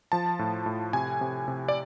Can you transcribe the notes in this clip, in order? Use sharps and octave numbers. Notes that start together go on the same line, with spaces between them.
F3 A5
A2
A2
C3 G#5
C3
C3
D5